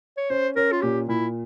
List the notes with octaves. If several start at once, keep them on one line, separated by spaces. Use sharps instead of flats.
C#5
C#4 C5
C#4 A#4
F4
A#2 G4
A#2 E4